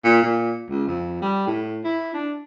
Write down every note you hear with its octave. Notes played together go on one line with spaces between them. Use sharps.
A#2
A#2
C#2
F2
G3
A2
E4
D4